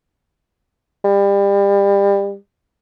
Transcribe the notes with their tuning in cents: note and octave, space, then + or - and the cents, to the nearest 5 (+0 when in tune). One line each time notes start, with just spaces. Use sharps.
G3 +30